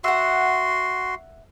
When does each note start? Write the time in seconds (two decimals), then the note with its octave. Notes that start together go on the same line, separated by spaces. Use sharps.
0.04 F#4 E5 F#5 C6